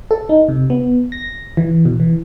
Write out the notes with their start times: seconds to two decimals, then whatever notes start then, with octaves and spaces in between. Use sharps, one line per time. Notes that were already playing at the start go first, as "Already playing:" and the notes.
0.11 A4
0.29 D#4
0.49 C3
0.70 B3
1.12 A#6
1.57 E3
1.85 B2
2.00 E3